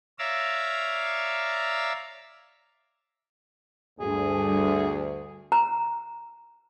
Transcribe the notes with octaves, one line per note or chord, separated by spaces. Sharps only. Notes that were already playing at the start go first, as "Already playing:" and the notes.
C#5 D5 E5 F5 A#5 E6
D2 G2 G#4
A#5